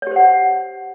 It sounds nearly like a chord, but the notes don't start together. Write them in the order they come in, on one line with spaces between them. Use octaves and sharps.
C#5 G4 C5 F#5